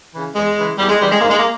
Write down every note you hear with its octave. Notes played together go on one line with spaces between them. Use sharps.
C#3 E3
E2 G#3
C#3 E3
E2 G3
G#3
C#3 E3 G3
G#3
G#2 A#3
G#3
A#3